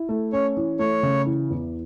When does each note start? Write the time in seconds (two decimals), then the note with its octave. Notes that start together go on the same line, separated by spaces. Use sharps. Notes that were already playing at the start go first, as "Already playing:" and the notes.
Already playing: E4
0.09 A3
0.33 C#4 C#5
0.57 E3
0.79 A3 C#5
1.03 C#3
1.26 E3
1.50 E2